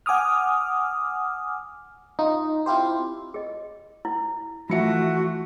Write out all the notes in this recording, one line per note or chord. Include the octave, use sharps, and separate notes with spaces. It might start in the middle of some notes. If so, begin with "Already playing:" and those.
F#5 G#5 D6 D#6 F6
D#4 F4
C4 E4 F4 G4 C5
G#4 D#5
E4
E3 F3 A3 F4 F#4 E5 C#7